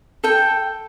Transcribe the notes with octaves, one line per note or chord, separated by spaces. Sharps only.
A4 G5